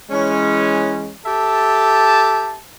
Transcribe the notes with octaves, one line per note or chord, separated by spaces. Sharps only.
E3 G#3 C#4
G4 A4 E5 A5